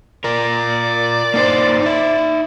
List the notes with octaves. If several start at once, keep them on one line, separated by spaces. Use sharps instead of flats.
F4 A#4 D5
A#3 D#4 C5
D#4 E5